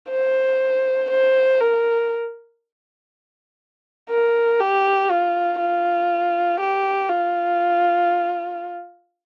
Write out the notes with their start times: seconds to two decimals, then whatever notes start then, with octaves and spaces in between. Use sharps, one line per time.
0.10 C5
1.10 C5
1.61 A#4
4.10 A#4
4.60 G4
5.10 F4
5.60 F4
6.60 G4
7.10 F4